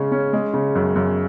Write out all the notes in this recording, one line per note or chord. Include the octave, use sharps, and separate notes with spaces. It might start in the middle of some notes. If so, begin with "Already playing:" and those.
Already playing: C#3 G#3 C#4
C#4
G#3
C#3
F#2
F#2